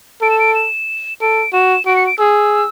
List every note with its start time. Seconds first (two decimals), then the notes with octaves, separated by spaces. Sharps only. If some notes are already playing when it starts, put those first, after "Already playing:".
0.21 A4 D7
0.30 E7
0.39 D7
0.55 E7
1.21 A4 D7
1.53 F#4 E7
1.86 F#4 D7
1.96 C#7
2.07 D7
2.18 G#4 E6